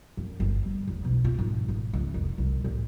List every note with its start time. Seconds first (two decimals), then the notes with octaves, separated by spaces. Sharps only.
0.17 F#2
0.40 G1
0.63 G3
0.88 E2
1.05 B1
1.25 F4
1.39 G#2
1.68 G#1
1.93 C#2
2.14 F1
2.38 C2
2.64 A1